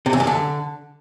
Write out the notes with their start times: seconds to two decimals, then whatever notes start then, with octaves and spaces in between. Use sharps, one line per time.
0.06 C3
0.13 E2
0.20 F#2
0.27 D3